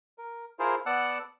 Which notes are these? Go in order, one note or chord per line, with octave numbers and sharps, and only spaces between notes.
A#4
E4 F4 G#4 A#4 C5
B3 D5 F#5 A5 E6 F#6